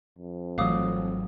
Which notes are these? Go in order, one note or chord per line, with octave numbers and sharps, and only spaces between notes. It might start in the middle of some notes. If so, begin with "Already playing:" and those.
F2
G#1 E3 F#3 A3 F5 D6 D#6